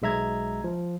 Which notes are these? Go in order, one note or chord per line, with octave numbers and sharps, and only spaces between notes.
B1 G#3 E5 A#5 G#6
F3